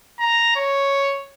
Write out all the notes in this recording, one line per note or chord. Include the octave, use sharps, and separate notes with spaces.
A#5
C#5